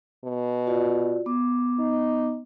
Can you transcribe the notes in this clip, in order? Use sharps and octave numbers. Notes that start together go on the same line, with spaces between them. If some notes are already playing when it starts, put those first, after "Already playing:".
B2
F4 F#4 D5
B3 D6
D#4